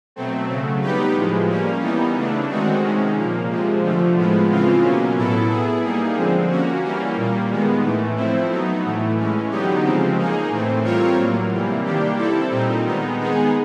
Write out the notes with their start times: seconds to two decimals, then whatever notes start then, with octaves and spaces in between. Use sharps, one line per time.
0.16 B2 F#3 A3 C4
0.49 C#3 F#3 A3
0.82 G3 B3 D#4 G4 B4
1.15 A2 F3 G#3
1.49 G3 A#3 C#4
1.82 E3 G3 B3 D#4
2.15 C#3 E3 A3 D4
2.49 D#3 G#3 C4 D#4 F#4
2.82 C3 D#3 G#3 C#4
3.16 A#2 F3 A#3
3.49 C3 F3 G#3
3.83 D3 F3 A3
4.16 A2 F3 G#3 B3
4.49 C#3 E3 G#3 C4 F4
4.82 B2 F#3 A#3 C#4
5.16 A2 F#3 B3 E4 A4
5.50 B3 E4 G#4
5.83 G3 A#3 D#4 G#4
6.16 D3 F3 G#3 C4
6.49 A#3 C#4 F#4
6.83 E3 G3 A#3 C#4
7.17 A#2 G3 A#3
7.50 D#3 G#3 B3
7.83 A2 E3 A3
8.16 F3 A3 C4 E4
8.50 F#3 B3 D#4
8.84 A2 E3 A3
9.17 E3 G#3 C#4
9.50 D3 F#3 B3 D#4 G4
9.84 C#3 F3 G#3 C4
10.16 A#3 D#4 G#4
10.50 A2 E3 A3 C4
10.84 G3 C4 F4 A#4 C#5
11.17 A2 F#3 A#3
11.50 C3 E3 G3 A#3
11.84 D#3 G3 A#3 D4 G4
12.17 G3 C4 E4 A4
12.51 A#2 G3 C4 D#4
12.84 D#3 G#3 B3 D#4
13.17 D#3 G#3 B3 D#4 G#4